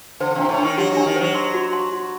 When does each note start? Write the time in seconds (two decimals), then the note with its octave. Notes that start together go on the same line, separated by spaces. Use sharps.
0.20 D3 C5
0.31 D3
0.35 C3 D4
0.49 A2
0.58 D#3 D4
0.78 F#3 G4
0.91 F#3
0.97 D4
1.06 D#3
1.16 F#3 C5
1.35 C6
1.54 F#4
1.73 C6
1.92 F#4